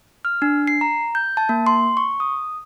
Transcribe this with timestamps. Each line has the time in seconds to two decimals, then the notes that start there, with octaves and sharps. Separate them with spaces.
0.25 F6
0.42 D4
0.67 C7
0.81 A#5
1.15 G6
1.37 A5
1.49 A#3
1.67 C6
1.97 C#6
2.20 D#6